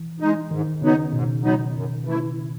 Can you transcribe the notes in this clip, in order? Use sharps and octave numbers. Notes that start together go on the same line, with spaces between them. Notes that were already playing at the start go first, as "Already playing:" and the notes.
Already playing: E3
G#3 D#4
G#2 D#3
C#3 F#3 B3 D#4
G#2 B2
F#3 B3 D#4
F#2
E3 A3 E4